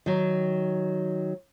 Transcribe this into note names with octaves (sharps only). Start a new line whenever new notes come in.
D#3 F#3